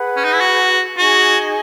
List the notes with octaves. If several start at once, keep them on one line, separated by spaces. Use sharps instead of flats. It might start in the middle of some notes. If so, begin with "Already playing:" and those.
Already playing: G#4 B4 F#5
C#4
D#4
E4
F#4
D#4 F#4 G#4 D#5 G#5